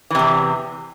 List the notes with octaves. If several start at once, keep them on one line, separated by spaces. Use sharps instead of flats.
E2 C3 E3